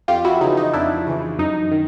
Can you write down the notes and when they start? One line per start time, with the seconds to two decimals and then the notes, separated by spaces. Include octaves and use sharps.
0.08 F2 F4 G4
0.25 E4 F#4
0.41 C#3 E3 D#4
0.57 D#4
0.73 F2 D4 E4
1.07 C#3 E3
1.39 F#2 D#4
1.72 D#3